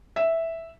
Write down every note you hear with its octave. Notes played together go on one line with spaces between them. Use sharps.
E5